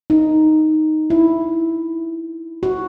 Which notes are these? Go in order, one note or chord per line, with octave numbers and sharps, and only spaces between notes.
D#4
E4
F#4